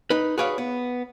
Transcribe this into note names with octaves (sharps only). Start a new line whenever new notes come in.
D#4 B4
F#4 G#4 B4 C#5 D5 F5
B3